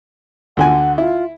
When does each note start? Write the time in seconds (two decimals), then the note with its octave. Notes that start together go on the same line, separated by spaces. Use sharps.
0.57 D2 D3 F#5 G#5
0.98 E4 F4